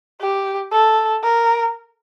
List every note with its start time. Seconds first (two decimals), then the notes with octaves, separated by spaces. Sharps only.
0.21 G4
0.72 A4
1.24 A#4